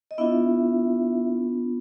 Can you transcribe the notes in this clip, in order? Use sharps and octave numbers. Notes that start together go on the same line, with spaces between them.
D#5
B3 D4 E4 F4 E5